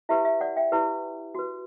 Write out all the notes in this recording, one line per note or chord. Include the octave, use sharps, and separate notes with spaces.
E4 G4 B4 E5
E5
D5 F#5
E5 G5
E4 G4 B4
F#4 B4